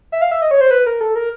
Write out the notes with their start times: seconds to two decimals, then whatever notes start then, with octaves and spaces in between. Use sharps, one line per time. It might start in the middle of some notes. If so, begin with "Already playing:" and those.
0.12 E5
0.22 F5
0.31 E5
0.42 D#5
0.51 C#5
0.61 C5
0.71 B4
0.86 A#4
1.01 A4
1.15 A#4